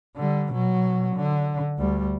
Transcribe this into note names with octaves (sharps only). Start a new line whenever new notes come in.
D3 G3
B2 F#3
D3
D2 G3